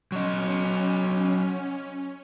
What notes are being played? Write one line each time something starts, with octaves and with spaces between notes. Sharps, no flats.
F#3 C#4 D#5